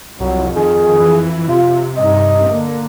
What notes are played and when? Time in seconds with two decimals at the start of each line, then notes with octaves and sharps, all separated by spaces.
0.20 C2 F2 F#3
0.56 D#3 G#4
1.00 E3
1.48 C3 F4
1.97 G2 D#4 D#5
2.47 D3 A#3